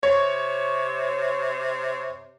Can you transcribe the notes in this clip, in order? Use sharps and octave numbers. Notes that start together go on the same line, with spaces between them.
C3 C#5